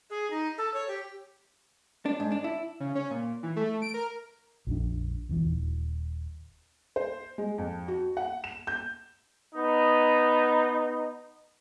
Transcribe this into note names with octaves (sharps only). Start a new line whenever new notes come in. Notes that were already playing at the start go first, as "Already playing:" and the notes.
G#4
D#4
A4
C#5
G4
D4
G#2
D4
E4
C#3
C#4
A#2
E3
A3
D7
A#4
A#1 F2 D4
E1 B2 E3
D#1
C5
G#3
F2
F#4
F#5
E7
G6
B3 D#4